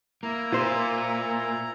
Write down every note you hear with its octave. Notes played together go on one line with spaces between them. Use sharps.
A#3 E4 A#5
A#2 F4 C5